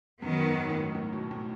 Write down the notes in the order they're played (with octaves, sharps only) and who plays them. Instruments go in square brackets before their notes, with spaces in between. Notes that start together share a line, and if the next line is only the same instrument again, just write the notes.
[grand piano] F#2 [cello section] D#3 F#3 B3
[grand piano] G#2
A2
A2
B2
A2